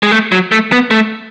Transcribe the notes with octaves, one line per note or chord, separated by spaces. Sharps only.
G#3
A3
F#3
A3
B3
A3